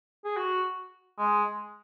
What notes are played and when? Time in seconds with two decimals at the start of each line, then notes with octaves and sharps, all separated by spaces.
0.25 G#4
0.37 F#4
1.18 G#3